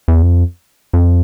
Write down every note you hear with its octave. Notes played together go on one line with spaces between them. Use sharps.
E2
F2
F2